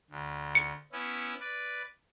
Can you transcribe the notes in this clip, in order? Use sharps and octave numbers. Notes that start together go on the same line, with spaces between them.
D2
C#7
B3 C#4 E4
B4 D5